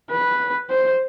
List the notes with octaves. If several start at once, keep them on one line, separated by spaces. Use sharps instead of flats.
B4
C5